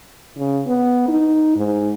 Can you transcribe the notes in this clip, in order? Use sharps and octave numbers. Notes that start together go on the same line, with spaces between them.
C#3
B3
D#4
G#2